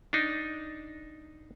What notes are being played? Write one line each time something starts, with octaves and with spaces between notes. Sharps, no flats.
D4 D#4